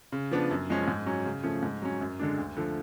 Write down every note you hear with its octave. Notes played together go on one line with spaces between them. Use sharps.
C#3
F3 B3 D4
F#2
F3 G#3 C#4
G#2
F#3 C#4
C#3
F3 A3 C#4
G#2
F#3 C#4
F#2
D3 G#3 D4
D2
D3 F3 A3